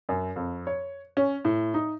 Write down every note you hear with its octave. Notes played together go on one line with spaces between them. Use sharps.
F#2
F2
C#5
C#4
A2
D#4